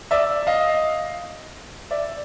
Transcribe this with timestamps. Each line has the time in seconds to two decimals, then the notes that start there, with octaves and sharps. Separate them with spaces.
0.11 D5 E5
0.47 D#5 F5
1.91 D5 E5